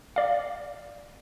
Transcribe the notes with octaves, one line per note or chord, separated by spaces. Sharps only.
D5 F5